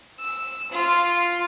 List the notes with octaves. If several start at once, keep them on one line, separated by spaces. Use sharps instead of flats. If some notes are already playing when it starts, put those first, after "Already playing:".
E6
F4